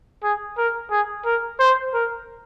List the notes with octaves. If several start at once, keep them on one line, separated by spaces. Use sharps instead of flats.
G#4
A#4
G#4
A#4
C5
A#4